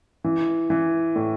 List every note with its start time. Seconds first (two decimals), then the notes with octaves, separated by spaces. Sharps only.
0.24 E3
0.70 E3
1.16 A2